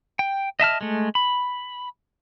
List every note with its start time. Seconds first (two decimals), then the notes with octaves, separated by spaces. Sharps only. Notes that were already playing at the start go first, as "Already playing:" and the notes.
0.19 G5
0.60 D#5 E5 A5 F6
0.81 G#3 A3
1.15 B5